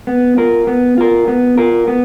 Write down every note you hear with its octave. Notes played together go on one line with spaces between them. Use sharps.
B3
F4 A#4
B3
F4 A#4
B3
F4 A#4
B3